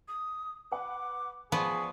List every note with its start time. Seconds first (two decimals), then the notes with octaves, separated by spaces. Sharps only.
0.08 D#6
0.72 B4 F#5 D6
1.52 F3 B3 G#4 B4 D5 C#6